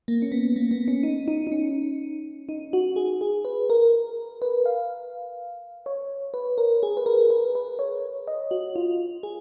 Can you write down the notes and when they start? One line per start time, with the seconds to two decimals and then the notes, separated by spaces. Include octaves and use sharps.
0.08 A#3
0.22 C#4
0.32 B3
0.56 A#3
0.71 B3
0.88 C#4
1.03 D#4
1.28 D#4
1.47 D#4
1.52 C#4
2.49 D#4
2.73 F#4
2.96 G#4
3.21 G#4
3.45 B4
3.70 A#4
4.42 B4
4.66 F5
5.86 C#5
6.34 B4
6.58 A#4
6.83 G#4
6.97 B4
7.06 A#4
7.30 B4
7.55 B4
7.79 C#5
8.28 D#5
8.51 F#4
8.76 F4
9.23 G#4